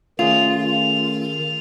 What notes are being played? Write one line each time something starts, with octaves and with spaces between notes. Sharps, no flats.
D#3 A3 C#4 F4 G#4 F7